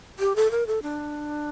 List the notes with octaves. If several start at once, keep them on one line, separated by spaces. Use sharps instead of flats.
G4
A4
A#4
A4
D4